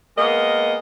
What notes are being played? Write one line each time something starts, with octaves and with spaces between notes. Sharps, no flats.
G#3 A#3 B3 A#4 D#5